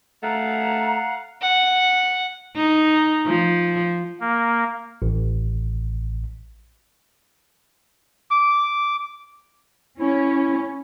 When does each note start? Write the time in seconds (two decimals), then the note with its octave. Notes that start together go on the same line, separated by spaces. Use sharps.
0.23 A3 F5 F#5 A#5
1.41 F#5
2.56 D#4
3.26 F3
4.20 A#3
5.02 A1
8.31 D6
10.00 C#4 E4